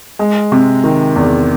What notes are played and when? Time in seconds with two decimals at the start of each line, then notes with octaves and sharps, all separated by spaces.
0.19 G#3
0.52 C3
0.84 D#3
1.16 E2